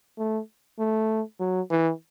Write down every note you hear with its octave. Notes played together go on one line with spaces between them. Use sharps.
A3
A3
F#3
E3